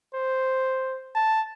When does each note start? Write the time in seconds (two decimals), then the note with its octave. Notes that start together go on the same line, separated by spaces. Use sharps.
0.15 C5
1.15 A5